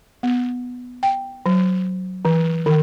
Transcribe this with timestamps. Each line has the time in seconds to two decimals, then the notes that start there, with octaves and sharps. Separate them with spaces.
0.23 B3
1.03 G5
1.46 F#3
2.25 E3
2.66 D#3